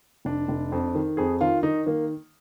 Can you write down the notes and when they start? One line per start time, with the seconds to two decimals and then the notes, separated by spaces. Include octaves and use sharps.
0.25 F1 D4
0.48 F1
0.72 F2
0.95 D#3
1.17 F2 G#4
1.41 D#3 F4
1.63 D#3 D#4
1.86 D#3 A#3